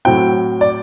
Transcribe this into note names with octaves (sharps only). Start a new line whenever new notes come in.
A2 F#3 C4 G5
D5